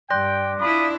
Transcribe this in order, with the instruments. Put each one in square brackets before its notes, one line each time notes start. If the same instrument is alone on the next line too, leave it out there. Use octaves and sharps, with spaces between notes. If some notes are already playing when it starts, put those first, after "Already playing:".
[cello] G2 [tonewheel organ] D5 [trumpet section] G5 [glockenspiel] C6 F#6 A#6
[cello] D4 E4 [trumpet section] F4 B5 D#6